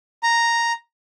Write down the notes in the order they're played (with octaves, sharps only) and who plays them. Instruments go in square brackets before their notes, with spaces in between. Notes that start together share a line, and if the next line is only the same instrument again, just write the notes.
[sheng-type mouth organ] A#5